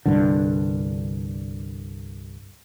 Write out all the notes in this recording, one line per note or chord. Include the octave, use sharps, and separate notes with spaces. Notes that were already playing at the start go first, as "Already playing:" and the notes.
C2 G2 D3